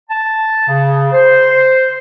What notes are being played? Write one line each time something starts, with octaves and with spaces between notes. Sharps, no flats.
A5
C#3
C5